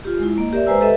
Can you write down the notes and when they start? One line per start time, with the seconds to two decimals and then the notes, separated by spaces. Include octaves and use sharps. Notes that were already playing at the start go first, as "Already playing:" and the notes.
0.05 F4 G4
0.19 G#3 E4
0.38 A#3 D#5
0.53 G4 A#4 D5 E5
0.67 G#3 B4 C5 G#5 A#5 E6
0.81 G4 A4 B4 D#5 E5